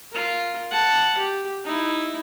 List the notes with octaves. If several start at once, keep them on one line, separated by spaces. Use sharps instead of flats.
F4 A#4
F#5 A5
G4
D#4 E4